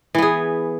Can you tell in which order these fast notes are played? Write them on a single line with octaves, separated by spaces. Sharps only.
E3 B3 G#4